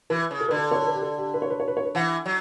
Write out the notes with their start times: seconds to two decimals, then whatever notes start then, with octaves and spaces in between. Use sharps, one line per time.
0.10 E3 B4
0.31 C#3
0.40 A4
0.48 D3 B4
0.57 A4
0.71 C#5
0.82 A4
0.87 B4
0.94 G4
1.02 A4
1.18 G4
1.34 B4
1.42 C#5
1.50 B4
1.60 C#5
1.68 B4
1.77 C#5
1.85 B4
1.95 E3 F#5
2.26 F#3